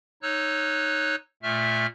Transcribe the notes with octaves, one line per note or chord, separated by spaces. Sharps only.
D#4 C#5 E6 F#6
A#2 A3 E5 F6